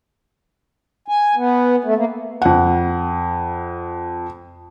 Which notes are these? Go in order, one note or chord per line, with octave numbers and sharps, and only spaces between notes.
G#5
B3
A3
A#3
F2 F#5